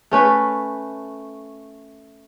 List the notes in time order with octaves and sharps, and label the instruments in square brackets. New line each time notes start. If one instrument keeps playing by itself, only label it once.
[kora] A3 C#4 B4